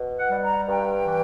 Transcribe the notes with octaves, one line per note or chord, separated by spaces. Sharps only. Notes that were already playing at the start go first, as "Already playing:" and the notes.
Already playing: B2
F#5
G3
A#5
G2 G5
E3